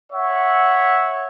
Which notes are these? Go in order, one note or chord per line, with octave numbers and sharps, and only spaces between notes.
C#5 E5 F#5